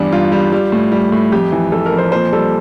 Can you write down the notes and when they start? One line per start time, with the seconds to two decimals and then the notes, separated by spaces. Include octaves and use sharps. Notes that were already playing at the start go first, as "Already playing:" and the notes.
Already playing: E2 G2 G3 D4
0.12 G2 F4
0.32 G3
0.52 G3
0.72 A2
0.92 G3
1.12 A2
1.32 F2 G4
1.52 E3
1.72 F2 A4
1.86 A#4
1.92 F2
1.98 C5
2.12 A#2 C5
2.33 G3 A4